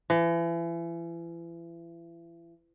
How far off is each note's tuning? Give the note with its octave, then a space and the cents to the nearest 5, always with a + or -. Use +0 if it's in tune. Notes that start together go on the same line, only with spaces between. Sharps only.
E3 +35